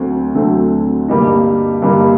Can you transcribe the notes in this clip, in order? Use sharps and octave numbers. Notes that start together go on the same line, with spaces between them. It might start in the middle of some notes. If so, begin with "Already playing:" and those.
Already playing: D2 D3 F#3 A3 C4
D2 D3 F#3 A3 C4
G2 D3 G3 A#3 D#4
G2 D3 G3 A#3 D#4